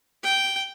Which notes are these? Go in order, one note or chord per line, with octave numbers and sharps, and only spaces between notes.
G5